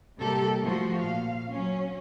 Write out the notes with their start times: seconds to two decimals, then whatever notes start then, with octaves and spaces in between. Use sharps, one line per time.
0.19 C3 G3 A#3 G4 A4 A#4
0.62 F3 A3 F#4
0.98 A#2 F5
1.51 F#3 C#4